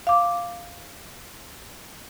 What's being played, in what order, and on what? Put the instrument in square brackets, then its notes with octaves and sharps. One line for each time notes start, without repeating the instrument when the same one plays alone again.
[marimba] F5 D6